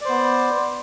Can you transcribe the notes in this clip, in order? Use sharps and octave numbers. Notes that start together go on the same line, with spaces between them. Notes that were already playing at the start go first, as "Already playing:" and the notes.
B3 C5 D5